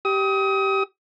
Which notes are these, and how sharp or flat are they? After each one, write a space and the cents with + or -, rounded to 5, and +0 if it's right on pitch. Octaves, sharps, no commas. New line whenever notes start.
G4 -10 D#6 +30